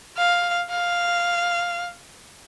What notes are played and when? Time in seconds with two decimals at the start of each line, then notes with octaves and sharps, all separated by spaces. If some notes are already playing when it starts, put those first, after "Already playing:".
0.17 F5
0.71 F5